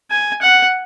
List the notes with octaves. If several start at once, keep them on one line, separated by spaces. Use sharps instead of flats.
G#5
F#5